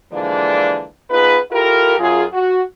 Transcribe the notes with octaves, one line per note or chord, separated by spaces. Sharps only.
D3 E3 F3 G#3 A#3 D4
B3 D#4 F4 G#4 B4
E4 F4 G4 A4 A#4
F#2 F4 G#4
F#4